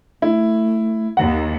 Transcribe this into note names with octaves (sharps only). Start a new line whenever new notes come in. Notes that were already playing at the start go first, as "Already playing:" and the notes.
A3 E4
D#2 F#5